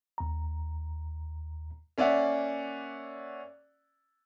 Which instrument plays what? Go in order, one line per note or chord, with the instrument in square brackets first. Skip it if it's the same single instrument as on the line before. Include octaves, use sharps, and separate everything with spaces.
[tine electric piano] D#2 A#5
[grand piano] A#3 C#4 D5 E5 F#5